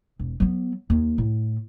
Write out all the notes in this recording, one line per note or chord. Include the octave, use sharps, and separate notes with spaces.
E1
F#3 B3
D#2
A2